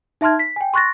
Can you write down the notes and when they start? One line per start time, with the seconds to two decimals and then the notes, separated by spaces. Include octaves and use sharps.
0.21 D#4 E5 A5 C6 F6 G#6
0.39 B6
0.56 G5 G#5
0.74 C6 C#6 F#6 A6 A#6